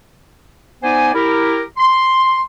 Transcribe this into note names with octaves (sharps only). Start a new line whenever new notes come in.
B3 D#4 C5 D5 G#5
E4 G4 A#4
C6